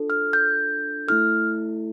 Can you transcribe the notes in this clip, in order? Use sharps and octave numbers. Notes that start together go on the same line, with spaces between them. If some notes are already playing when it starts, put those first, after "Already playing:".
Already playing: D4 F4 A4
F6
G6
A3 E4 A4 F6